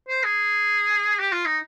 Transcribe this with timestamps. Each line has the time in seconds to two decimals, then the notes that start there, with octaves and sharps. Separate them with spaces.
0.09 C5
0.24 G#4
1.19 G4
1.32 F4
1.45 D#4